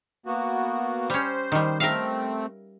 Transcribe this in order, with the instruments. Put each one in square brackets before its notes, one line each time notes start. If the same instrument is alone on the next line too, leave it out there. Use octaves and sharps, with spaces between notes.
[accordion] A#3 B3 F#4
[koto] G3 C#4 [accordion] C5
[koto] D#3 G3
[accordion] A3 C4 [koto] A#4 E5 F5